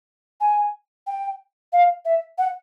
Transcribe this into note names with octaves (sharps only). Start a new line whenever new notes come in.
G#5
G5
F5
E5
F#5